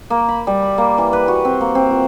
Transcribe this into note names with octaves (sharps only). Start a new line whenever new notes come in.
A#3
B5
G3
B5
A#3
E3
B4
F#4
C4
A#3
C4
F4